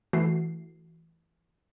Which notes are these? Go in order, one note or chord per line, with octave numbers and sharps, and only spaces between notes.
E3 A3 F#4 C7